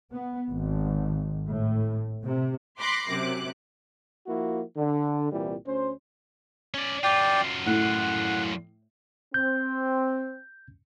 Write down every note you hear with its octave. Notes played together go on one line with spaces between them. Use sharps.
B3
G#1
A2
C3
B5 C6 D6 F#6 A#6 C7
F#2 C3 D6 F#6
F3 A#3 E4 F#4
D3
C2 A#2 E3 G3
D2 C#4 C5
C#4 D5
F#2 F4 D5 G5
A2 F#5
C4 G6